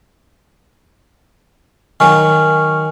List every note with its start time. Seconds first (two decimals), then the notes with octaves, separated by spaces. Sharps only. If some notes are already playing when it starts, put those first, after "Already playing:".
2.00 D#3 F#3 G#5 C#6 F6